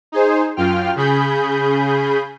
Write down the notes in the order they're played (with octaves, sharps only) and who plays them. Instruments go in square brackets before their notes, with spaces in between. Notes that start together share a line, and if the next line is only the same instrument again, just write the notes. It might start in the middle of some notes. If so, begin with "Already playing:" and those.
[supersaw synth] D#4 G#4 C5
F#2 F4 G5 F6
C#3 G#4 B5 G6